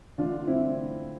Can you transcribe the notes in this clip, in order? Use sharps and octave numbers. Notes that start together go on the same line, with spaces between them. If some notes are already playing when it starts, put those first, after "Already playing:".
D3 A3 D4 F4
C4 E4